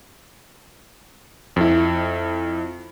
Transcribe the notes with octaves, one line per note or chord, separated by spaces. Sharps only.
F2 E4